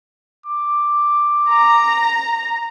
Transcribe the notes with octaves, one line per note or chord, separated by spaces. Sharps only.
D6
A#5